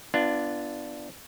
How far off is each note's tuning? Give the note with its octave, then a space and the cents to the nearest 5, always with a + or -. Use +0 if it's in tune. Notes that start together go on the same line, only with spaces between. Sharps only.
B3 +0 D4 +0 F4 -30